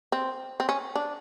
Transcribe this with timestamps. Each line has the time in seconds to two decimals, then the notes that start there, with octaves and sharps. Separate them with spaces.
0.12 C4
0.60 C4
0.69 C#4
0.95 D4